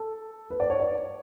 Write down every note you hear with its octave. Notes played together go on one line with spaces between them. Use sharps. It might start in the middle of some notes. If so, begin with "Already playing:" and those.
Already playing: A4
B4
D5
C#5
D5